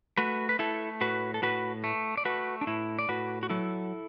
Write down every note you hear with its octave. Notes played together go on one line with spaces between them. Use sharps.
A3 F#4 B4
B4
A3 E4 A4
A2 F#4 B4
A4
A2 F#4 B4
A3
D5
A3 F#4 B4
D4
A2 E4
D5
A2 F#4 B4
F#4
F#3 E4 A4